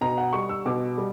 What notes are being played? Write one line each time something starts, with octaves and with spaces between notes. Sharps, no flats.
B2 A#5
F#5
G3 C#6
E6
B2 D6
G3